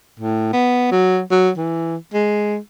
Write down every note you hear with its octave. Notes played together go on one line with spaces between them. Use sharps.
A2
B3
F#3
F#3
E3
G#3